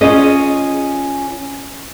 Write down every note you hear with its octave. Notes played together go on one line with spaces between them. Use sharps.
C#4 F4 G#4 D#5